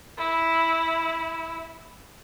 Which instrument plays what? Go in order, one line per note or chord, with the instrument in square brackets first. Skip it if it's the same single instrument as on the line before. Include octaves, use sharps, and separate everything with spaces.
[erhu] E4